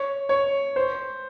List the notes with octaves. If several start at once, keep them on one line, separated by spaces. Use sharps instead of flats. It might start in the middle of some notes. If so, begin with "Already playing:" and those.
Already playing: C#5
C#5
C5